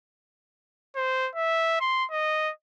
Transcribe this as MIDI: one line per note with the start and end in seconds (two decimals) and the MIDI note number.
0.96 1.29 72
1.35 1.78 76
1.80 2.05 84
2.11 2.51 75